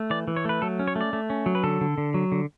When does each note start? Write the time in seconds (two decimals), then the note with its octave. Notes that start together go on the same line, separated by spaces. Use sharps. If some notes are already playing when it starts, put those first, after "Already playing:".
Already playing: A3
0.10 E3 D5
0.28 E3
0.37 C#5
0.45 A3 B4
0.62 F#3 A4
0.79 C#4
0.88 C#5
0.96 A3
1.01 D5
1.13 A3
1.30 C#4
1.46 F#3
1.55 B4
1.64 D3 A4
1.81 D3
1.98 D3
2.14 F#3
2.32 D3